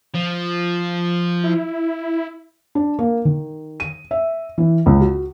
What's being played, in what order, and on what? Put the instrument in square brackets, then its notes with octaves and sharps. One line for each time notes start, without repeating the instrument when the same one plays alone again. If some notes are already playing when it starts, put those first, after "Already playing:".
[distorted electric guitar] F3
[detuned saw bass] E4
[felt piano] D4
A#3
D#3
D#7
E5
E3
C#2
F#4